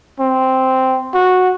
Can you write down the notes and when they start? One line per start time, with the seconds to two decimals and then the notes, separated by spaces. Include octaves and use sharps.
0.20 C4
1.14 F#4